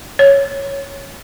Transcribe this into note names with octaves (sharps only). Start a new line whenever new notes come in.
C#5